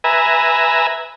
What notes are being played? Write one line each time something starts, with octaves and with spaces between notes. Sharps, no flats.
B4 E5 G#5 A#5